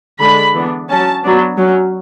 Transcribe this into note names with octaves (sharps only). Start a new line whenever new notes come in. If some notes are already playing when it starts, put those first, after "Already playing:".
D3 G#3 D4 B5
E3 B3 D4
F#3 C#4 A5
F#3 B3 D4
F#3 C#4